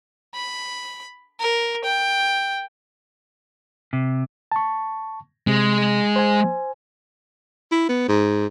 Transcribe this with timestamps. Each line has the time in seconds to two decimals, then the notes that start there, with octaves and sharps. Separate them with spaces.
0.35 B5
1.40 A#4
1.85 G5
3.93 C3
4.52 A5 C#6
5.47 C3 G#3
6.16 C5 G#5
7.72 E4
7.89 B3
8.08 G#2